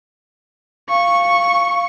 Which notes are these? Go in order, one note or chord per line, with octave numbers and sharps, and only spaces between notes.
F5 C#6